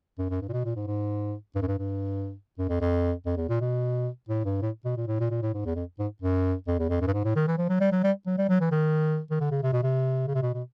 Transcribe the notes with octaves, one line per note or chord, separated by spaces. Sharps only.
F#2
F#2
G2
A#2
B2
A#2
G#2
G#2
G2
F#2
G2
G2
F#2
F2
F2
F2
E2
A#2
B2
A2
G2
A2
B2
A#2
A2
A#2
A#2
A2
G#2
E2
F2
G#2
F#2
F2
E2
F2
F#2
G2
G#2
A2
D#3
E3
F3
F#3
G3
F#3
G3
F#3
G3
F#3
E3
D#3
D#3
D3
C#3
C3
B2
C3
C#3
C3
B2
B2